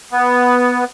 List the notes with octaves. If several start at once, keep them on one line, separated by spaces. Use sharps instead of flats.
B3